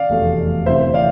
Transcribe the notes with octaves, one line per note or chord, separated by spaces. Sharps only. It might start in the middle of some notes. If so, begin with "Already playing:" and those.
Already playing: D5 F5
F1 E2 B2 A3
D2 C3 E3 C5 E5
D5 F5